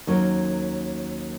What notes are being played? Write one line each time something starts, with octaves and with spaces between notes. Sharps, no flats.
D#2 F#3 C#4 A#4